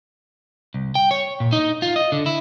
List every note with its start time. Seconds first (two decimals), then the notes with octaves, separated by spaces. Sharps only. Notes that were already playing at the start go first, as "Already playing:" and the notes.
0.74 C2
0.95 G5
1.11 C#5
1.40 A#2
1.53 D#4
1.82 F4
1.96 D#5
2.12 D3
2.26 E4